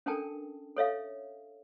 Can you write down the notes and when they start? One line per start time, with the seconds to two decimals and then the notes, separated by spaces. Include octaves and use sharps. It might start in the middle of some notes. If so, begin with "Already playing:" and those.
0.06 C#4 D4 A4 A#4 G5 A5
0.77 A4 C#5 E5 F5